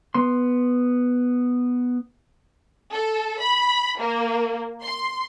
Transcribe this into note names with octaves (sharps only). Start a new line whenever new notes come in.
B3 C6
A4
B5
A#3
C6